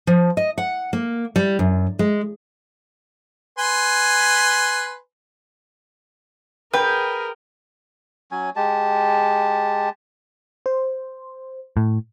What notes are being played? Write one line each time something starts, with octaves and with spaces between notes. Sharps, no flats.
F3
D#5
F#5
A#3
G3
F#2
G#3
B4 G#5 C6
G#4 A#4 B4 G5
F#3 C#4 G#5
G#3 G4 A5
C5
A2